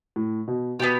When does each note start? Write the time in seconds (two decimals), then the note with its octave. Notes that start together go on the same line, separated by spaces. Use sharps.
0.16 A2
0.48 B2
0.79 B2 B3 D4 G4